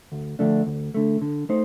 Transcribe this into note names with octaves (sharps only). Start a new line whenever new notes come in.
D2
D3 F3 A3 D4
D2
D3 A3
D3
A3 D#4 C5